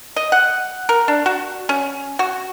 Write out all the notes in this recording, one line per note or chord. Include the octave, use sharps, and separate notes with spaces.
D#5
F#5
A#4
D4
F#4
C#4
F#4